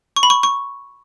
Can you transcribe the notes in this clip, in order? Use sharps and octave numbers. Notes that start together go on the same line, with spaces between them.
C#6
B5
C#6
C#6